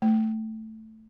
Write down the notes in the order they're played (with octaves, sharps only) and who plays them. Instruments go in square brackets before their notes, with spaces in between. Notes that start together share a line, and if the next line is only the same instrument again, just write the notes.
[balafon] A3